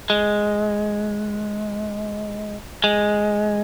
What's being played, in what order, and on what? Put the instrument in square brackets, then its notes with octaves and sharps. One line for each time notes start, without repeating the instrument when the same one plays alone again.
[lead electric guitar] G#3
G#3